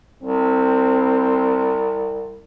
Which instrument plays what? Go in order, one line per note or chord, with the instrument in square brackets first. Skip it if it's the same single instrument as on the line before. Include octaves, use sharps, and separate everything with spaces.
[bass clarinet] C2 [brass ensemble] C4